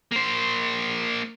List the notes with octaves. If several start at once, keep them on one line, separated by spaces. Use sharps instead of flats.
A#3 C5